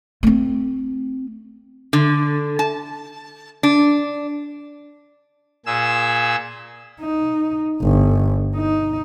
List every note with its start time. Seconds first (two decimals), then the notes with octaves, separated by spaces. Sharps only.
0.23 A3 C4
1.93 D3
2.59 A5
3.63 D4
5.66 A#2 G#4 E6
7.01 D#4
7.82 G1
8.56 D#4